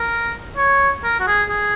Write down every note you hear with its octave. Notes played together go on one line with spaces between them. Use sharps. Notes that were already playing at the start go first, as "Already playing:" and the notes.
Already playing: A#4
C#5
A#4
F#4
G#4
G#4